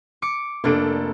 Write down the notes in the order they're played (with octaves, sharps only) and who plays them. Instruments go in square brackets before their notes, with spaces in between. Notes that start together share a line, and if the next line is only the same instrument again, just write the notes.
[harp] D6 C#7
[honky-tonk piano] F1 A4 D7 [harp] A#3 D4